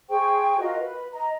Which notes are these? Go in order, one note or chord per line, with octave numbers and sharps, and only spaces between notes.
G#4 C5 G5 C#6
F4 F#4 A#4 D#5
B4
D#5 A#5